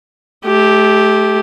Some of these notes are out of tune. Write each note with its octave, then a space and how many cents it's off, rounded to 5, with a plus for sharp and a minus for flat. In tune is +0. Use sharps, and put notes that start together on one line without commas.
A3 -30 G4 +0